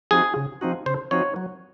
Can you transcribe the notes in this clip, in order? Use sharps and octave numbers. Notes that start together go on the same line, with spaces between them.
F3 C4 D#4 F#4 G#4
C#3
F3 C4 D#4 F#4
C#3 C5
F3 C4 D#4 F#4 C#5
F#3